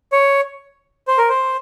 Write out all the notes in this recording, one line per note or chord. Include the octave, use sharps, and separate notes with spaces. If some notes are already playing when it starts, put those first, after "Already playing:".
C#5
C5
A#4
C5